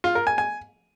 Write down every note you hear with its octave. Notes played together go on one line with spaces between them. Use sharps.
F4
A#4
G#5
G#5